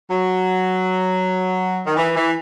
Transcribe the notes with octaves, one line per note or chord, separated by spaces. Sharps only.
F#3
D#3
E3
E3